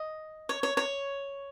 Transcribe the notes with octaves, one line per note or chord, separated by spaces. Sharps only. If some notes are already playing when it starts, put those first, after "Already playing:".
Already playing: D#5
C#5
C#5
C#5